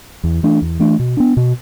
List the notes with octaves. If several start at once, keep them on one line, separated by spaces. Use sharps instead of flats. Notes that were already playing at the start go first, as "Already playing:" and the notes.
E2
E3 A3 D4
E2
E3 A3 D4
B2
B3 D4
B2